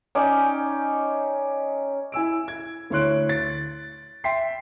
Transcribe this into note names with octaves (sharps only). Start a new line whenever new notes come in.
C#4 D#4 D5 G5
E4 G#5 E6 D7
G#6
D2 E4 C#5 C6 F#6 D7
A6
E5 G5 C6 B6 C7